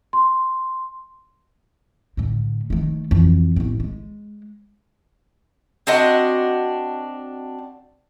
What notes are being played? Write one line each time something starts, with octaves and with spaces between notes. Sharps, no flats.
C6
A2 D3
D#3 A3
F2 E3
A1 B3
G#3
C4 D4 F#4 D#5